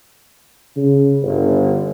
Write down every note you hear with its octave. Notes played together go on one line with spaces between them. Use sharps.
C#3
G1